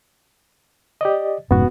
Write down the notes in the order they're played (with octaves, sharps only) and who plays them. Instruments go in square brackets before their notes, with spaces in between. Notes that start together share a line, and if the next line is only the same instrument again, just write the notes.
[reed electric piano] G4 D5 D#5
[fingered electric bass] F1 G#2 C#4 [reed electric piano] B3 F#4